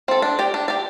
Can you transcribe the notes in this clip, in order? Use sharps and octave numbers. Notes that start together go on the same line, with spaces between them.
C4 A4
D4
G4 D5
D4
G4 D5